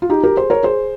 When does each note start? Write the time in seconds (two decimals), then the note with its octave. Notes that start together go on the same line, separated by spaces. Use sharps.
0.02 F4
0.10 D#4 G4
0.24 G4 A#4
0.37 G#4 C5
0.50 A#4 C#5
0.63 G#4 C5